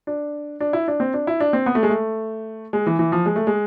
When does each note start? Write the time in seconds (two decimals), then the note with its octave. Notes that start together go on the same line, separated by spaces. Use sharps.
0.07 D4
0.60 D4
0.73 E4
0.88 D4
1.00 C4
1.14 D4
1.27 E4
1.40 D4
1.53 C4
1.66 B3
1.75 A3
1.83 G#3
1.89 A3
2.73 G#3
2.87 E3
2.99 E3
3.12 F3
3.26 G#3
3.36 A3
3.47 G#3